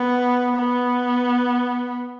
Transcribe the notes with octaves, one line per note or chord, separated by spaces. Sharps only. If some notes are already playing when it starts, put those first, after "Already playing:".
Already playing: B3
B3